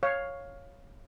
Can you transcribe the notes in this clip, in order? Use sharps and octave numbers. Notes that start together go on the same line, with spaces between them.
C#5 F5